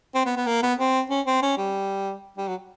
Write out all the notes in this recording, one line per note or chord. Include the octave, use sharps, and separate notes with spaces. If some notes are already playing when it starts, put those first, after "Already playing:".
C4
B3
B3
A#3
B3
C4
C#4
C4
C#4
G3
G3
F#3